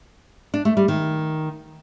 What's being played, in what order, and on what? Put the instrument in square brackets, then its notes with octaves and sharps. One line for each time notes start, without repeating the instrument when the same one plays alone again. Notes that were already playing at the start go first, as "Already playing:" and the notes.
[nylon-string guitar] D4
A3
G3
D#3